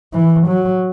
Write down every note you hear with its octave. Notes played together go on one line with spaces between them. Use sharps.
E3
F#3